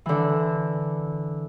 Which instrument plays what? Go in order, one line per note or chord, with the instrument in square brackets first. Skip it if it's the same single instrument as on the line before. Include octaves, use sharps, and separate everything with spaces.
[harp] D3 E3